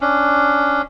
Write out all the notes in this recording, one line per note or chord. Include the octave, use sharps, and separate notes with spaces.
C#4 D4